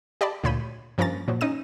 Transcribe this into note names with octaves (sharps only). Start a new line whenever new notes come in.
G4 D5 D#5 A5 B5
D2 A#2 C#5 B5 G6 D#7
G2 F3 A#3 C#4 A#5 A6
A#2 F3 F#3
C#4 D#4 D#6 D#7